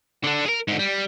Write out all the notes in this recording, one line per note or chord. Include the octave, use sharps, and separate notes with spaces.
D3 D4
G#4 A#4
G#2 D3
G3